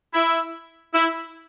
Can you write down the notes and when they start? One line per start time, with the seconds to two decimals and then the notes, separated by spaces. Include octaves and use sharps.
0.14 E4
0.94 E4